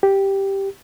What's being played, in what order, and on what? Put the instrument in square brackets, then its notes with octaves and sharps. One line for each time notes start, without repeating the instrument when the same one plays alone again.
[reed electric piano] G4